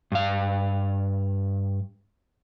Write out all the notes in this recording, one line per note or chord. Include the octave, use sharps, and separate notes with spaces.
G2 F5